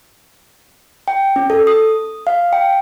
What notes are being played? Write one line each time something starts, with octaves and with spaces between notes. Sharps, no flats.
G5
C#4
A4
D#6
F5
G5